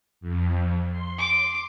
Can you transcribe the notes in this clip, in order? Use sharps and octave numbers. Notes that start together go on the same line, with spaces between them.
F2
C6
D6